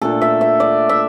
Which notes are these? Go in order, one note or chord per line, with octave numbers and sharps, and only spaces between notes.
A#2 A3 D4 A4
E5
E5
D5
E5